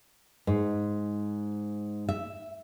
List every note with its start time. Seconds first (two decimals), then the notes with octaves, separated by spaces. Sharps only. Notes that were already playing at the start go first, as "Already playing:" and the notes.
0.47 G#2
2.09 E5